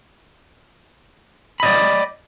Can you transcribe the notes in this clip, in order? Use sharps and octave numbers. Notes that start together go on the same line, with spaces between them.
D5 D#5 B5